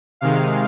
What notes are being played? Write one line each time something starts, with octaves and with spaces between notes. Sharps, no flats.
C3 D#3 G#3 F5